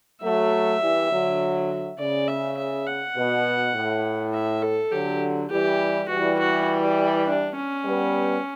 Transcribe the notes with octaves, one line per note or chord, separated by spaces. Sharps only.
F#3 A3 E5
E3 G3
D3 F#3
C#3 D5
E5
E5
F#5
B2
A2
E5
A4
D3 F#3 G4
E3 G3 G4
E3 G3 F#4
F#4
D4
C#4
G3 B3